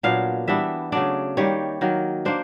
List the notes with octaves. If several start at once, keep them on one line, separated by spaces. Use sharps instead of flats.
A#2 F#3 B3 D4 F5
E3 G3 B3 D4 E5
C#3 F#3 A3 D4 D5
D#3 G3 A#3 C#5
D#3 F#3 A#3
A#3 D4 C5